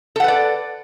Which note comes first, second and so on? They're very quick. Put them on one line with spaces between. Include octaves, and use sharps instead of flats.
A4 F#5 B4 D5